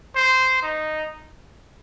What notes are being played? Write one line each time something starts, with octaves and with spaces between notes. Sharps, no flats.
C5
D#4